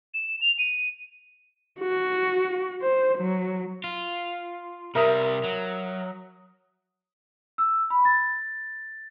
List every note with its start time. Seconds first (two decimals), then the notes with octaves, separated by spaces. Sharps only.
0.14 E7
0.41 F7
0.59 D#7
1.80 F#4
2.82 C5
3.18 F#3
3.84 F4
4.95 C3 G3 A#4 E5 D#6
5.44 F#3
7.58 E6
7.90 B5
8.05 A6